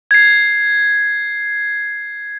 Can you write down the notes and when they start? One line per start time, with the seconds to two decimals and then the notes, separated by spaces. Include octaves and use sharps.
0.11 G#6 C7